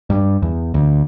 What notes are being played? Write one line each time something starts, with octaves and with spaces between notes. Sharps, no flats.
G2
E2
D2